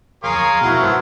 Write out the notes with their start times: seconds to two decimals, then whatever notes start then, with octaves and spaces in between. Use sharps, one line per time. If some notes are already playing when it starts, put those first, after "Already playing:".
0.23 D1 F2 G#4 A#4 C#5 F5 A#5 C6
0.61 F1 B1 B2 F#3 E4 F#4 F6
0.82 A#1 G2 B3 A4 C5